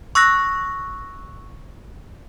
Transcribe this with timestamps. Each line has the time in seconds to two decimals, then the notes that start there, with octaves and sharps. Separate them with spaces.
0.15 C#6 E6 F#6 A#6